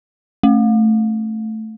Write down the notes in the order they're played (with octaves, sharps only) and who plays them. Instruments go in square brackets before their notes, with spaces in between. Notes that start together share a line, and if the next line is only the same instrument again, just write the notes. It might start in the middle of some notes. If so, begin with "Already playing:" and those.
[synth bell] A3